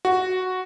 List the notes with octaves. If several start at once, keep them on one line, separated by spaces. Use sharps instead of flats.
F#4